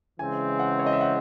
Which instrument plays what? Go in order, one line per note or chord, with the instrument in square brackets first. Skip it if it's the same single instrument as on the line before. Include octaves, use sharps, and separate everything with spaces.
[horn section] C#3 E3 G#3 C4 [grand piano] G#5
[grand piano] F#5
C#5
D#5
E5
F#5